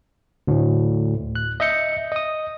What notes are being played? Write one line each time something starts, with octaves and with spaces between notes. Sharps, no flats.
D2 A2
F#6
D#5 E5 G6 C#7
D#5 D#6